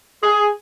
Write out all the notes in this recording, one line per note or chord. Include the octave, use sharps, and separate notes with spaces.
G#4